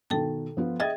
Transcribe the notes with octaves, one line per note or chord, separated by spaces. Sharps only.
B2 D#3 A4 G5 A5
F3 B3 F4
G#4 D#5 E5 G5 G#6 A6